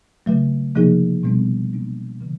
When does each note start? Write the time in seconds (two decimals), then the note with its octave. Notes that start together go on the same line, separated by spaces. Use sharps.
0.26 C#3 F#3 A3
0.75 C3 F3 A#3 D#4 G#4
1.23 B2 G3 B3 D4
1.73 F#3 A#3 D4
2.21 C#3 E3